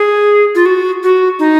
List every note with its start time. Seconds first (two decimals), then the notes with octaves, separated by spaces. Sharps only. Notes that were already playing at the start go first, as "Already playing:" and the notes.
Already playing: G#4
0.55 F4
0.66 F#4
1.03 F#4
1.39 D#4